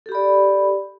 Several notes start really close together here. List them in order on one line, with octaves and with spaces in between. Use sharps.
A4 G4 B5 D5